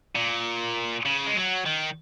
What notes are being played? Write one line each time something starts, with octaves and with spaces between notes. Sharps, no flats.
A#2
C#3
G#3
F#3
D#3